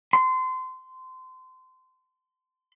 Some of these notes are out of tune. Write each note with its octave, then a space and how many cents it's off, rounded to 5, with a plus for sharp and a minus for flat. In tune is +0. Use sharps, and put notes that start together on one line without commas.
C6 -25